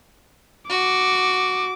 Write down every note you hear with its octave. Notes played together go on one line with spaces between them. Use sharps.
F#4 D6